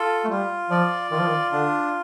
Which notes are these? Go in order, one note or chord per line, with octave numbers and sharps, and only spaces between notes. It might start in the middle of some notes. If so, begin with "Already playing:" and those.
Already playing: F4 A4
A3
G3 F4
F3 D5
D#3 F4
F3
D#3
D3 D4